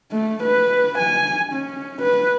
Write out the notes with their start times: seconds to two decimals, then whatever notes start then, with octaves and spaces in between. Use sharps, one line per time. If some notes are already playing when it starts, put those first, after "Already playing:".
0.12 A3
0.43 B4
0.99 G#5
1.53 C#4
2.02 B4